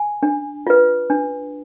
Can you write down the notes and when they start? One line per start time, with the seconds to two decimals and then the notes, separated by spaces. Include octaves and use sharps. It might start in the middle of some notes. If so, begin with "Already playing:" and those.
Already playing: G#5
0.23 D4
0.67 F4 B4
1.10 D4